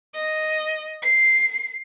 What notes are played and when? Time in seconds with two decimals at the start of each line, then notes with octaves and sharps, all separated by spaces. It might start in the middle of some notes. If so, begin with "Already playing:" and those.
0.15 D#5
1.03 C7